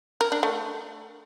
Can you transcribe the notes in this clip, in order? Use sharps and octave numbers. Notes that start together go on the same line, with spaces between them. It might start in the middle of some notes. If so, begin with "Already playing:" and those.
A#4
D4
A3